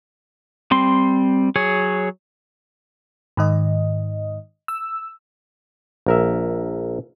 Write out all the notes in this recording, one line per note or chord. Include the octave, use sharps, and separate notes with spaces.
G3 C4 C6
F#3 G#4 C#5
G#2 D#3 D#5
E6
A#1 A#4 E5